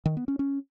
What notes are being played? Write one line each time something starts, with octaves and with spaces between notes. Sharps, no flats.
D#3
B3
C#4
C#4